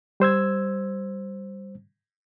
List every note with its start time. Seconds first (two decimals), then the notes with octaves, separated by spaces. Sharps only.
0.20 G3 C5 E6 G#6